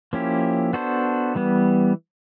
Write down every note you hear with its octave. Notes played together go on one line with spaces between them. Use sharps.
F3 A#3 C#4 E4 G4
B3 D4 F#4 A4 C5
E3 G3 B3